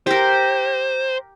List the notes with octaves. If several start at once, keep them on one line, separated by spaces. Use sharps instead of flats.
G4 A#4 C5